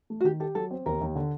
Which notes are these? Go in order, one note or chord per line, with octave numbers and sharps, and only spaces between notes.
A3
F#4
D#3 G4
G4 A4
F#3 A4
C4
D#2 A#4
D#2
D3